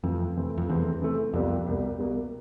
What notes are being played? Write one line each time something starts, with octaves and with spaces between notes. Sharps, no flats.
F2 C3 E3 A3 C4
C3 E3 A3 C4
F2
E2 C3 E3 A3 C4
C3 E3 A3 C4
C2 F2 B2 G3 A#3
C2 B2 G3 A#3
C2 B2 G3 A#3